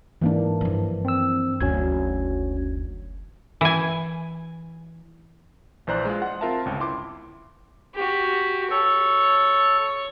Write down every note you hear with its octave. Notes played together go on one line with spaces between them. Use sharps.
G#2 E3 A#3 D4
G2 F3
C4 E6
F#1 D2 C#4 F#4 G#6
E3 G#5
A#1 E3 C5 D5 A#5 F#6
G#3 F4
F#5 C6
C4 F4 A#4 E5 A5
G1 C#2
E4 C6 D6
F#4 G4
A4 C#5